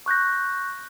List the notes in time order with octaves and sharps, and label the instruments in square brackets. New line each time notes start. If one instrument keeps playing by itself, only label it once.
[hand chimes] C#6 F#6 G6 A#6